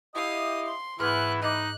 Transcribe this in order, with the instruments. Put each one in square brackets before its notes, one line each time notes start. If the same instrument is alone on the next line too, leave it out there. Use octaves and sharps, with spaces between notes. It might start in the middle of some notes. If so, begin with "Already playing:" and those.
[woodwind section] E4 G4 D#5 [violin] F5 D#6
[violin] C6
[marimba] G#2 F6 [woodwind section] E3 [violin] B3 F#6 [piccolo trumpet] E4
[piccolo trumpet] D#4 [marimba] D#5 D6 [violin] F#6